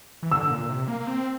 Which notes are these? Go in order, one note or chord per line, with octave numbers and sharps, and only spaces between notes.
E3
D3 E6
A#2
C3
A#3
A#3
C4